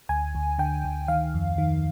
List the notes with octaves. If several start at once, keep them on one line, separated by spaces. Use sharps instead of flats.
D2 G#5
D2
D3 G5
D2
D#3 F5
F2
D#3